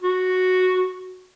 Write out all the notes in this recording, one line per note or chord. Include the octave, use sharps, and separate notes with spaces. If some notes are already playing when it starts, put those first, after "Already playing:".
F#4